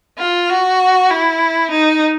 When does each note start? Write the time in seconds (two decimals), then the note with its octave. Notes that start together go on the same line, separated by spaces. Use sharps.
0.19 F4
0.50 F#4
1.11 E4
1.71 D#4